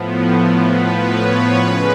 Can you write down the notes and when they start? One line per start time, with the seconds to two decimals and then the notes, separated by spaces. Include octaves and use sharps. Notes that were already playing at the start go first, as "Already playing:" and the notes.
Already playing: A2 F3 B3
0.67 B4
1.12 C#5
1.57 C#3 G#3 C#4 B4